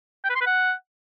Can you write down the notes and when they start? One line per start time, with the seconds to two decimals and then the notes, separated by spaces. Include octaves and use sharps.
0.24 G5
0.30 B4
0.35 C6
0.41 B4
0.46 F#5